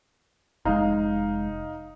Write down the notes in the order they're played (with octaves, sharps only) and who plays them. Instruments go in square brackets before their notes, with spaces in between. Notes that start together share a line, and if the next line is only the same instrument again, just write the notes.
[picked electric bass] F1 G#3 [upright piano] D#4 F5